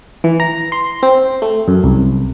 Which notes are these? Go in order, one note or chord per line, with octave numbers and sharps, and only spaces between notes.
E3
A#5
C6
C4
A3
F#2
C2